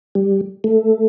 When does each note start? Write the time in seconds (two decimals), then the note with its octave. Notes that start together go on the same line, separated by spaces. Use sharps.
0.15 G3
0.64 A3